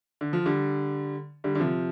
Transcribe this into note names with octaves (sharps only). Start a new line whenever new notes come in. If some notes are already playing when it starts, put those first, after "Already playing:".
D3
F3
D3 G3
D3 G3
D3
C3 F3